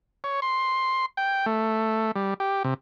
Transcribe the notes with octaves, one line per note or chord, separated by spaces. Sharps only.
C#5
C6
G5
A3
G3
G4
C3